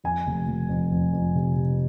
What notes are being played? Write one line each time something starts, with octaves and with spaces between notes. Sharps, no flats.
F2 G#5
F1
F1
F2
F2
F2
C3
C3